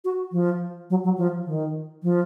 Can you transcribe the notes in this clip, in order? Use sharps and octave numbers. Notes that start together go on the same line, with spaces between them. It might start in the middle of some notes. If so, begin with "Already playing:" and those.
F#4
F3
F#3
F#3
F3
D#3
F3